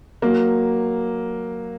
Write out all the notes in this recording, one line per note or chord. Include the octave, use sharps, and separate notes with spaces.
F#3 A#3